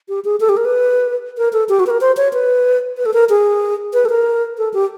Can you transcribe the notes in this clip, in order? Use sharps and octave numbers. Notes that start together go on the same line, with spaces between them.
G4
G#4
A4
G4
A#4
B4
A#4
A4
G4
F#4
B4
A#4
C5
C#5
B4
B4
A4
A#4
G#4
B4
A4
A#4
A4
G4